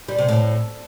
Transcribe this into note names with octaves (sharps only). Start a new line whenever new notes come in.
G3
C3
A2